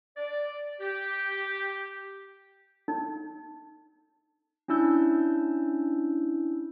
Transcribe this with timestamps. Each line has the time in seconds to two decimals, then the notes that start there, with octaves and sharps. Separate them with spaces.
0.17 D5
0.80 G4
2.88 D#4
4.68 C#4 D4 E4 E6 G6